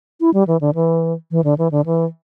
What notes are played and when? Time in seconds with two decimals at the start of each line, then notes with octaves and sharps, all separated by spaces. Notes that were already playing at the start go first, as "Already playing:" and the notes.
0.20 E4
0.34 G3
0.47 E3
0.61 D3
0.75 E3
1.31 E3
1.44 D3
1.58 E3
1.72 D3
1.86 E3